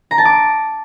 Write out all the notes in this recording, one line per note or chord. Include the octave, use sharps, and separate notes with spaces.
A#5
A5
D6